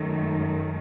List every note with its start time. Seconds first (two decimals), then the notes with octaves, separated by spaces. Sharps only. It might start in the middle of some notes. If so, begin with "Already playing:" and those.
Already playing: F#2 D#3 A3